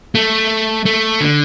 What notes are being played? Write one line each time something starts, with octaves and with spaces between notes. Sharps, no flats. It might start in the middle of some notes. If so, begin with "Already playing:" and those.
A3
A3
D3